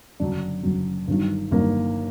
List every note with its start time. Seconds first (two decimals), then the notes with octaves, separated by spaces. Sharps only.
0.20 F#1 F#2 D3 F#3 D4
0.63 F#1 F#2 D3 F#3
1.07 G1 G2 D#3 F#3
1.51 G1 G2 D#3 F#3 A#3